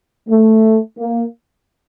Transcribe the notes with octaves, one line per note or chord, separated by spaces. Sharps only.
A3
A#3